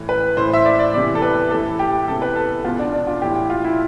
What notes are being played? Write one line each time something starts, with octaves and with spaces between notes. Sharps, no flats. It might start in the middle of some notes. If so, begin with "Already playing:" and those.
Already playing: A2 E3
B4
A2 E3 C5
E5
D5
D5
E2 C3 E3 D5
A4
B4
A2 E3 A4
G4
E2 C3 E3 A4
B4
A4
E2 B2 F4
D4
D4
F4
A2 E3 G4
F4
E4